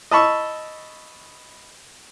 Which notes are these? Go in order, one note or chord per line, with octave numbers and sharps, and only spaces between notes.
D#5 A5 B5 C#6 E6